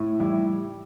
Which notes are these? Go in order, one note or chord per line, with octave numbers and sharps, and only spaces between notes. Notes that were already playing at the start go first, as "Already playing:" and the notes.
Already playing: A2
G3 E4